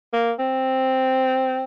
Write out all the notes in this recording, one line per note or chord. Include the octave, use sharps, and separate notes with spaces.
A#3
C4